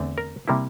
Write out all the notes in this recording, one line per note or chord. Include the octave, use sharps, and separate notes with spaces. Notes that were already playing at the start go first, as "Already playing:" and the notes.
Already playing: E2 D3 A3 C4
A#4
C3 G3 A#3 E4